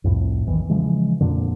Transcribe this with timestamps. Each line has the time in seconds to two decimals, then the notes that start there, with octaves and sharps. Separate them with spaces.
0.04 C2 F2 A2
0.46 A#1 E2 D#3 E3
0.70 C#3 E3 F3 G#3
1.21 F2 A#2 D3